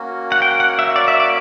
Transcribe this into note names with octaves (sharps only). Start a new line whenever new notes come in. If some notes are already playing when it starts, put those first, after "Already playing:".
Already playing: A#3 C#4 F#4
F#5
G5
F#5
E5
D5
E5
D5